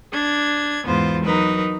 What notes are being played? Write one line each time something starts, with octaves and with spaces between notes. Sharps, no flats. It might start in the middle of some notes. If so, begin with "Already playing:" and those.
D4 G#6
E2 G#2 B3 F4 C5
F#3 D#4 A#4 B4